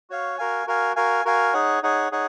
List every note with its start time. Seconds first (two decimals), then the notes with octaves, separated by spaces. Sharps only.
0.10 F#4 C#5 F5
0.38 F#4 A#4 F5 G#5
0.67 F#4 A#4 F5 G#5
0.96 F#4 A#4 F5 G#5
1.25 F#4 A#4 F5 G#5
1.53 D#4 G#4 C#5 F#5
1.83 D#4 G#4 C#5 F#5
2.12 D#4 G#4 C#5 F#5